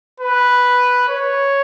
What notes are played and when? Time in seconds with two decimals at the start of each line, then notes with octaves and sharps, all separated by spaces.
0.20 B4
1.08 C#5